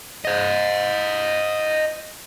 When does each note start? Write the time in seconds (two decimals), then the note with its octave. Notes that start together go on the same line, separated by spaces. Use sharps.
0.25 C5 D#5